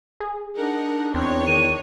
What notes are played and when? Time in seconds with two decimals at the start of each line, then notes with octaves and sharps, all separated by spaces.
0.20 G#4
0.57 D4 D#4 A#4 F#5
1.14 E2 C4 D4 D#4 C#5
1.47 D#3 D#7